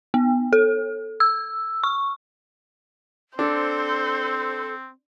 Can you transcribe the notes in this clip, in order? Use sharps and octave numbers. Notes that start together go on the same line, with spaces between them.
B3
A4
E6
C#6
C4 D4 A4 C5